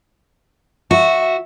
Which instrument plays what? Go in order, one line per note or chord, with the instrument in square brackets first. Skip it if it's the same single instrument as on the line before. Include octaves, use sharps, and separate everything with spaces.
[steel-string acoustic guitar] F#4 [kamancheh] E5